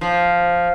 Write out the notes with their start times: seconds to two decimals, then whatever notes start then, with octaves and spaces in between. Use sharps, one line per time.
0.01 F3